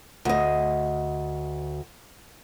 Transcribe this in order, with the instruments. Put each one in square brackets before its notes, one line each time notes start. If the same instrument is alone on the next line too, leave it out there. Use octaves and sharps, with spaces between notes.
[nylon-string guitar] D2 D#5